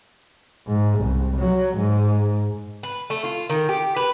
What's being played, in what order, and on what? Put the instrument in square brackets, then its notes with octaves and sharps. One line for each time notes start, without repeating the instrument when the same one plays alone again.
[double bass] G#2
C2
F#3
G#2
[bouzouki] B4
A3
F4
D#3
G4
B4